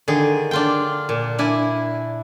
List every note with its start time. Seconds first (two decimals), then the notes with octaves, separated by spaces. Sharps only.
0.08 D3 D#3 G#4
0.51 D4 F4 G5
1.09 A#2
1.39 D4 E4 G#5